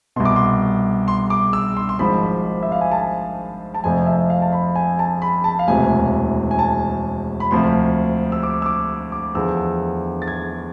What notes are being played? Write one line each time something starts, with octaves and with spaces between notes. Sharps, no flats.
C2 B2 C6
D6
C6
C6
D6
E6
C6
C6
G#1 G#2 F3 B5
E5
F5
G#5
A5
A5
F1 F2 C3 F3 G#5
E5
F5
A5
B5
G#5
A5
B5
A5
F5
E1 D2 C3 E3 G#5
G#5
A5
B5
D2 C3 F3 C6
E6
D6
E6
D6
D6
E2 D3 F3 E6
A6
G#6